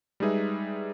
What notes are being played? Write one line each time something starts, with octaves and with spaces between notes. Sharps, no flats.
G3 G#3 D#4 G#4 B4 E5